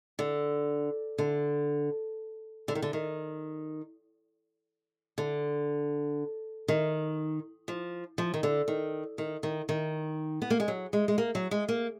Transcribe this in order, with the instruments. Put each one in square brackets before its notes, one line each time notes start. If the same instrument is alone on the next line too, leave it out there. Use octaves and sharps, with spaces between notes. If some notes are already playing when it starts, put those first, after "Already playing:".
[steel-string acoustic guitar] D3
D3
D3
D#3
D3
D#3
D3
D#3
F3
F3
D#3
D3
D#3
D#3
D#3
D#3
B3
A#3
G#3
F#3
G#3
G#3
A#3
F#3
G#3
A#3